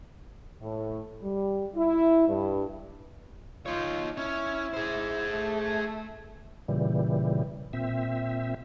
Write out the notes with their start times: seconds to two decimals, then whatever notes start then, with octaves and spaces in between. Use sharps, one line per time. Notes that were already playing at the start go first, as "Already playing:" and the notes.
0.61 A2
1.22 G3
1.75 E4
2.28 G2
3.66 D#4 F4 C#5
4.17 C#4 E4 C#5
4.74 G#4 C5
5.31 A3
6.68 A#2 C#3 E3 G3
7.73 A#2 C4 E5